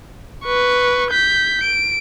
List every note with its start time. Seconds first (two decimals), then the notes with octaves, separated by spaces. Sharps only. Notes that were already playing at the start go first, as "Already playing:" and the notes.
0.45 B4 C#6
1.11 G6 B6
1.64 D7